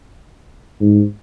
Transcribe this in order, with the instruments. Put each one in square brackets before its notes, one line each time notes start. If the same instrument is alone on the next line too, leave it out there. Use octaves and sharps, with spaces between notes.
[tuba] G#2